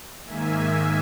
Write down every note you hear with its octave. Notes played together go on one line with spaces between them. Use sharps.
G#2 D#3 A#3 E5 G#5
E5 G#5